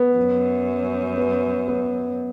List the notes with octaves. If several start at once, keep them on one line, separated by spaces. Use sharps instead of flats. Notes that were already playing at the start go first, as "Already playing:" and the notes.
Already playing: B3
F#2
B3
B3